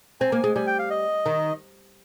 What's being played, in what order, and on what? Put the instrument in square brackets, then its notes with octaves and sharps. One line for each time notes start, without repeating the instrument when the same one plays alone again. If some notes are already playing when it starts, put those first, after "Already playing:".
[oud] C4 [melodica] G#5
[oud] A#3
G#3
[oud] G3 [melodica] G#5
[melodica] G5
F5
D#5
[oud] D#3